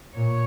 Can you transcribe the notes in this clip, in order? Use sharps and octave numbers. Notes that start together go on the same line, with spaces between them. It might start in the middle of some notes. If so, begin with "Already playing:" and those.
A#2 C#5